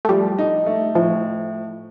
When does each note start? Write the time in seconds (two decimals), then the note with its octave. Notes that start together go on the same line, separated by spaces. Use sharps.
0.05 A3
0.09 F3 G3
0.38 D#4
0.66 A3
0.95 A2 F3